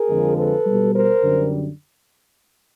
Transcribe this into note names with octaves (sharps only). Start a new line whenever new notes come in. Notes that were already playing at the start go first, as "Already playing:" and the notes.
Already playing: G#4 A#4
F2 D3 F3 G#3
A4 B4
B2 G3
A#4 C5
F#2 D3 G3